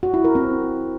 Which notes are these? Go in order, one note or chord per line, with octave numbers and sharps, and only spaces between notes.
F#4
E4
A#4
C4